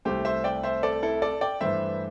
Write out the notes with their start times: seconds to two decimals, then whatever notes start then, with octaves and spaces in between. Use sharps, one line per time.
0.05 C2 C3 A3 G4 C5
0.25 C5 E5
0.44 D5 G5
0.63 C5 E5
0.83 A4 D5
1.03 E4 A4
1.22 A4 D5
1.41 D5 G5
1.61 G2 E3 A3 C5 E5